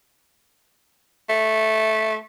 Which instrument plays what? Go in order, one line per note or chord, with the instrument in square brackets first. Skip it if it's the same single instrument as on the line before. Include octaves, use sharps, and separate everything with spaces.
[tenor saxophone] A3